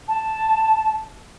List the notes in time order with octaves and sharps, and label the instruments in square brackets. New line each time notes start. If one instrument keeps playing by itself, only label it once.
[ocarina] A5